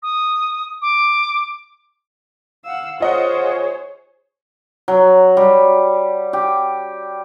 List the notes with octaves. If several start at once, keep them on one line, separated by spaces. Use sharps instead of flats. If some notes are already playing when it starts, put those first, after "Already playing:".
D#6
D6
F5 F#5 E6
F4 G#4 C5 C#5 D#5 F#5
F#3
G3
G4